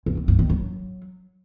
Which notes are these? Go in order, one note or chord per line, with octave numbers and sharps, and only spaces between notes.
G2
B3
G2
D#3
F#3